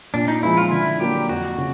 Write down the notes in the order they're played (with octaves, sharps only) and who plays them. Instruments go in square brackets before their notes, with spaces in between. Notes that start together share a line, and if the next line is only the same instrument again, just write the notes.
[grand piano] A#2 [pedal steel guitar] D4
[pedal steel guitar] D#4
[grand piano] F3 G#3 C#4 F4 [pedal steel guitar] E4
[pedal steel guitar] F4
[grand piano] D3 [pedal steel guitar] E4
[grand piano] F#3 A#3 D4 [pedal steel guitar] G4
[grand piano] F2 [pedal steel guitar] F#4
[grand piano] C#3